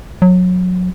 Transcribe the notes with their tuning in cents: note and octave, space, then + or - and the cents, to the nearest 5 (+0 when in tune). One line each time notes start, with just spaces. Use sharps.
F#3 -25